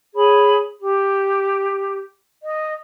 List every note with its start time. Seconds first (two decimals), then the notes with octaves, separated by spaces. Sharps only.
0.14 G#4 C#5 B5
0.80 G4
2.41 D#5